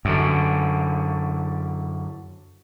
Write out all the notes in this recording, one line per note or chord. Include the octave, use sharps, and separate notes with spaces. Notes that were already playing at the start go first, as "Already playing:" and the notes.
F#2 D3